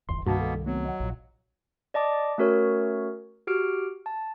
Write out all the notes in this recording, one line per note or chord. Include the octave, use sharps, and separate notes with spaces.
D1 G1 E2 C6
C2 G2 B2 D#3 A#3 B3 F#4 A5
G3 A4
F#3 A3 B3 C4
D#5 F#5
A#1 A#2
D5 D#5 A5 D6
A3 C#4 F#4 A#4 C#5
F#4 G4 F6 D7
A5